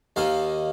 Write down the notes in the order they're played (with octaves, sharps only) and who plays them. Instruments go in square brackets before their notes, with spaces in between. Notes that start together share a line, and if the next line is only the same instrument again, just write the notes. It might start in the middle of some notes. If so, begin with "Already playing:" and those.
[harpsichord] D#2 D#3 A#3 F5